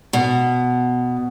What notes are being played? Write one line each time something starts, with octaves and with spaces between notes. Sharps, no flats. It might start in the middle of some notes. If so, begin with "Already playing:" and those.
B2